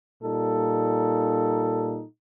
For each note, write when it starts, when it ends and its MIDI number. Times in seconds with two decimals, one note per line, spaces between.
0.22 2.02 46
0.22 2.02 55
0.22 2.02 63
0.22 2.02 69